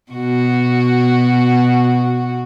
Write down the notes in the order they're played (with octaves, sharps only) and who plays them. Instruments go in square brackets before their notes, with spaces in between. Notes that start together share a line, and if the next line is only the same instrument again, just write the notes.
[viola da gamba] B2 F#4